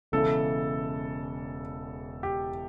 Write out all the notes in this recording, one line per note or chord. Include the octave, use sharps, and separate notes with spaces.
E1 E2 C#3 E3 A4
G4